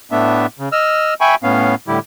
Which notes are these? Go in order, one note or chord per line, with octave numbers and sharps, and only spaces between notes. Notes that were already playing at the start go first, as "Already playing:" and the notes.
A2 A3 B3 D4 E5
C#3
D#5 E6 F6
E5 G5 G#5 B5 C#6
A2 B3 C#4 F5
A2 D3 G3 E4 G4